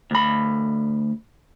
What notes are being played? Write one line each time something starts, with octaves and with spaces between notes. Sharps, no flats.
D2 B5